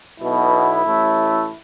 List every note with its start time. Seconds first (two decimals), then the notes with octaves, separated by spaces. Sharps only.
0.20 B1 B2 B3 E4
0.86 A1 A2 A3